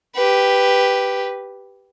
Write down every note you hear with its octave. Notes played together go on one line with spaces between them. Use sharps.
G4 B4